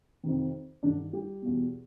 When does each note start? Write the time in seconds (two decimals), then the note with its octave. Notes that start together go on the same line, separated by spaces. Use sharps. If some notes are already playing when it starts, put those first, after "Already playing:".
0.23 F2 C3 D#3
0.83 G2 D3 D#3 D4
1.13 G3 G4
1.42 E2 B2